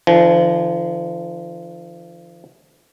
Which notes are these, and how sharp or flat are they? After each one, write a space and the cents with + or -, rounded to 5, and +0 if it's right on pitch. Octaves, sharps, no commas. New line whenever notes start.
D3 +25 F3 -35